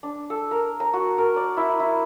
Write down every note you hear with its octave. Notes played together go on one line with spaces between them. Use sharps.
D4
A4
A#4
A#5
F#4
A#4
D5
E4
E4